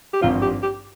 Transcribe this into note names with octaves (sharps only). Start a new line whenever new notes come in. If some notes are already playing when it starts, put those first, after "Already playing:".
G4
G#1 G2 F3 C4 F4
G4
G4